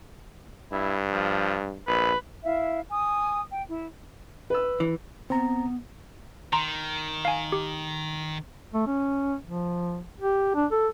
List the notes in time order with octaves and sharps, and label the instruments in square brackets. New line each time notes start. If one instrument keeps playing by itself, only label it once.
[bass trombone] G2 [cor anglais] E4
[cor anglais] F3
[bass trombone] A#1 [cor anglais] B4
[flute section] E4 E5 F5
G#5 D#6
G5
E4
[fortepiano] B4 E6
[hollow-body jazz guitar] E3
[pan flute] B3 [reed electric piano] C4 A#5
[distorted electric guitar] D#3 [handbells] A#5 C6
[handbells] F5 G#5
G4
[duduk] A3
C#4
F3
G4
D4
A4